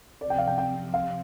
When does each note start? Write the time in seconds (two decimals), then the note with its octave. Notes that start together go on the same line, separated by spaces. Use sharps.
0.20 C3 F3 C4 D5
0.30 G5
0.38 F5
0.47 G5
0.58 G5
0.94 F5